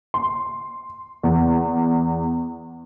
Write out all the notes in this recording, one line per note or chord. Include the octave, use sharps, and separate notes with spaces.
C6
E2